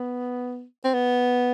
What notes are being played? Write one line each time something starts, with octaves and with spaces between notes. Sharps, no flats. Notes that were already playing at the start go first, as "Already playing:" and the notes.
Already playing: B3
C4
B3